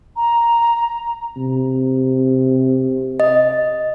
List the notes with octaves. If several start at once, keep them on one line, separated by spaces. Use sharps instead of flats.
A#5
C3
D#5